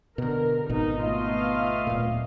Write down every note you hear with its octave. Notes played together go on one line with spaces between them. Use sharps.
B2 D3 A#4
G#1 B2 D#4
A3 B3 F4 D#5 F5
D1 A#2